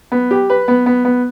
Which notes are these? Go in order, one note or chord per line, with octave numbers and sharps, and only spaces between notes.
B3
G4
B4
B3
B3
B3